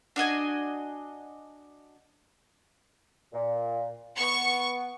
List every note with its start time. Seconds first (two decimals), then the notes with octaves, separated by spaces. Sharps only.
0.16 D4 F#4 D#5 G#5
3.33 A#2
4.19 B3 C#6